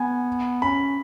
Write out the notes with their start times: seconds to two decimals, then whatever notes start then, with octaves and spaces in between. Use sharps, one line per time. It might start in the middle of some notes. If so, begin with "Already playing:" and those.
Already playing: B3 G#5
0.62 C#4 B5